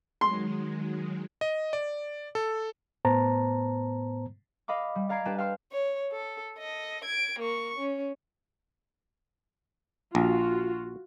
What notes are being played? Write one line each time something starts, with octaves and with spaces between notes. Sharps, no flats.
D#3 F#3 G#3 C6
D#5
D5
A4
A2 B3 C5 A5 A#5
D#5 F5 B5 D6
G3
D5 F5 A#5 G#6 C7 D7
D4 G4 B4 D5 G5 A5
F5 G5 A5 C6 F6
C#5
A4
A4 D#5
G#6 D7
A#3 C#6
C#4
A#1 F4 F#4